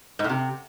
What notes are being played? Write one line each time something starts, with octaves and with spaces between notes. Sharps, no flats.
G#2
A2
C3